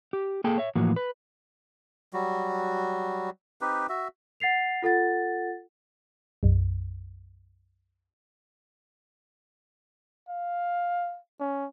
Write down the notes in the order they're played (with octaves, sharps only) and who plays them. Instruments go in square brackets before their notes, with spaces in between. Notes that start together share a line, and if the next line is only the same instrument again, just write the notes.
[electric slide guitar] G4
A#3 G#4 A4 G5
C#5 E5
A2 E3 F3 A#3 F#4
B4
[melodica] F#3 G3 F#4
C4 D#4 G4 B4
F#4 E5
[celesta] F#5 A6 C7 F7
F4 A4 F#5 A6
[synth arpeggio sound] B1 F#2
[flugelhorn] F5
C#4